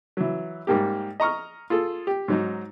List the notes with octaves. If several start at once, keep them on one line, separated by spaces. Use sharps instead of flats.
E3 F#3
G#2 G3 A#3 G4
D#5 A#5 C#6 F6
F4 G#4 A4
G4
G#2 F#3 D#4